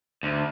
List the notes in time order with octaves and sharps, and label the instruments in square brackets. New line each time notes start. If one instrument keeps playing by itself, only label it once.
[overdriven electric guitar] D2